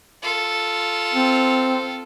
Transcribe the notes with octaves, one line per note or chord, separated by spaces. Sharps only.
F4 A4
C4